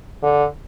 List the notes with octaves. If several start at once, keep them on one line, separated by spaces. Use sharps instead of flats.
D3